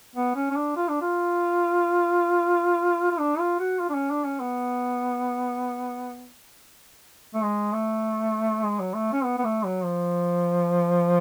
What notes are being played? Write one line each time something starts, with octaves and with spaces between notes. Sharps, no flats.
B3
C#4
C#4
D4
F4
D4
F4
F4
D4
F4
F#4
F4
D4
C#4
D4
C#4
B3
A3
G#3
A3
G#3
F#3
A3
C#4
B3
B3
A3
F#3
F3